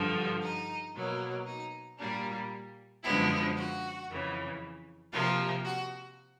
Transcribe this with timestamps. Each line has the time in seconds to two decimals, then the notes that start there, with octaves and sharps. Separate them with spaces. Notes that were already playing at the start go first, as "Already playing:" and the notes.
Already playing: G2 D3 F3
0.42 D#4
0.95 B2 F#3 A#3
1.46 D#4
1.99 A#2 G3 A#3 D4
3.03 F#2 D3 F3 G#3 B3 E4
3.56 F#4
4.09 F2 C#3 E3
5.13 C3 F3 A#3 F4
5.64 F#4